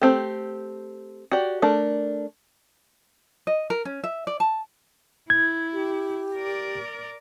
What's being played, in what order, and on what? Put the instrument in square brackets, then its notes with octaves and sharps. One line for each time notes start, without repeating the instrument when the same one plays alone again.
[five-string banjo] A3 C4 G4
F#4 G4 D5
A3 D4 A#4
[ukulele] D#5
A#4
C#4
E5
D5
A5
[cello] E4 [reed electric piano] G#6
[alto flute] G4
[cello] A#4 D5